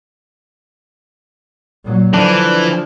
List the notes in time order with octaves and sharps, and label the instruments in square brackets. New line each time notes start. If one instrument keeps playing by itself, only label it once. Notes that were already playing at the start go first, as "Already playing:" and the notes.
[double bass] A#2 F#3
[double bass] D3 [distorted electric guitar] E3 [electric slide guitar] F3 D4